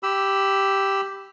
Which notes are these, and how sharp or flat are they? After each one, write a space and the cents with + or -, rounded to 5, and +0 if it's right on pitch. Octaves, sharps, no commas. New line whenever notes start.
G4 +0 B5 +15 E6 +0